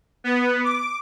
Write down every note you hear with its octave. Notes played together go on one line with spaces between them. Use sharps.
B3
D6